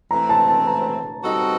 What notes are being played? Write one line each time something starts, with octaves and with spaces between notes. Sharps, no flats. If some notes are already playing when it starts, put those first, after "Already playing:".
E3 A3 C4 A#5
A5
A5
A#5
G3 C4 D#4 F#4 A4